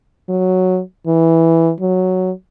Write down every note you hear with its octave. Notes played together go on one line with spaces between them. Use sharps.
F#3
E3
F#3